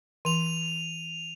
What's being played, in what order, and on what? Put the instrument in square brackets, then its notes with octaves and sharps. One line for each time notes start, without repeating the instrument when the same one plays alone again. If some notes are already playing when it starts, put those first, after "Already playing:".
[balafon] E3 [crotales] D#7 F7